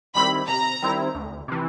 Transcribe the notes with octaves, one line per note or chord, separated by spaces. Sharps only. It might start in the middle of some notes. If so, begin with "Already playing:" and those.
D#3 G3 C4 E4 B5
C3 A#5
D#3 G3 C4 E4
D2
C3 E3